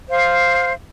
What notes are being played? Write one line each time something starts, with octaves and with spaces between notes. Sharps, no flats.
C5 F5